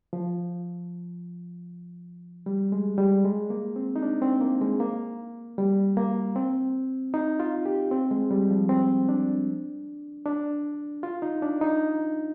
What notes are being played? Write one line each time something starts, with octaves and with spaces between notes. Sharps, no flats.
F3
G3
G#3
G3
G#3
A#3
C4
D#4
D4
C4
A#3
G#3
A#3
G3
A#3
C4
D#4
F4
G4
C4
G#3
G3
F3
C4
D4
D4
F4
D#4
D4
D#4